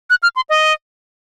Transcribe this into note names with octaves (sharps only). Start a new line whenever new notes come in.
F#6
F6
C6
D#5